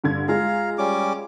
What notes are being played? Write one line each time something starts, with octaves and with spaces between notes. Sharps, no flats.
G2 D3 G#6
G#3 F4 G#4 F5 A#5
G3 C#4 D6